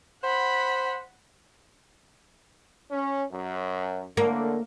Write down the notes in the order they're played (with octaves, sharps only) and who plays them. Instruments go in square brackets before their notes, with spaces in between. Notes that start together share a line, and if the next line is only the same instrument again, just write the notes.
[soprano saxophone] C5 [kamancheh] F#5 B5
[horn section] C#4
F#2
[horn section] A2 D3 [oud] A#3